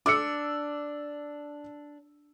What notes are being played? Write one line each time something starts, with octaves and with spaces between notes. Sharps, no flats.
D4 D6 E6 C#7